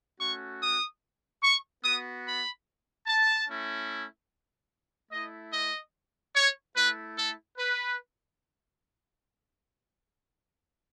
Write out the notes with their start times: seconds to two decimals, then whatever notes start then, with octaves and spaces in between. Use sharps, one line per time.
0.19 A3 C#4 F#4 C#6
0.61 D#6
1.43 C#6
1.84 B3 F#4 D#6
2.25 B5
3.07 A5
3.48 A3 C#4 E4
5.12 A3 E4 D#5
5.52 D#5
6.35 C#5
6.76 A3 E4 B4
7.17 A4
7.58 B4